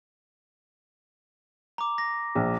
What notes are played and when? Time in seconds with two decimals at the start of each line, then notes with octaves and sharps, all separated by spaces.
1.78 A#5 D6
1.98 A#6
2.35 A#1